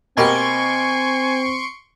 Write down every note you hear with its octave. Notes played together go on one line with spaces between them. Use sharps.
B2 A#3 C4 G4 G#5 C6 C#6 D7